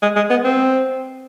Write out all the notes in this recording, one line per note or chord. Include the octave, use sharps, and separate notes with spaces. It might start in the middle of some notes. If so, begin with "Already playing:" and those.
G#3
G#3
B3
C4